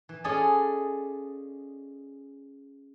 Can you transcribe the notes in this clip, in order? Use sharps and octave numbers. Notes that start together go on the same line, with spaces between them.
E3
C#4 F4 G#4 A4 D5 D#5